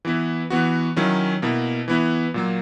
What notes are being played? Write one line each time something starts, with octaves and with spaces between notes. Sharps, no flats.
E3 B3 E4
E3 B3 F#4
D#3 F#3 C#4 E4
B2 A#3 E4
E3 B3 E4
A#2 F#3 A#3